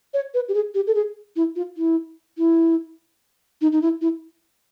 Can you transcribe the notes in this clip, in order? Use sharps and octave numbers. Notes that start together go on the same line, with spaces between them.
C#5
B4
G4
G#4
G4
A4
G#4
E4
F4
E4
E4
D#4
D#4
E4
E4